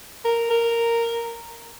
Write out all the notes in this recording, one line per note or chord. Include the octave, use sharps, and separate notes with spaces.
A#4
A#4